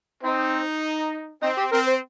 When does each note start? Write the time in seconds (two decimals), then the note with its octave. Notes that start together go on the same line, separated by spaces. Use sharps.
0.23 C4 D#4
1.42 C4 D#4
1.58 G4
1.72 C4 A#4
1.88 C5